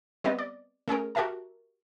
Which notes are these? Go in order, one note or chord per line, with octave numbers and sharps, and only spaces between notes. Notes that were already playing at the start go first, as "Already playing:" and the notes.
G3 B3 C4 D#5
D5
A3 C#4 G#4 A#4
F#4 G4 A#4 E5 A5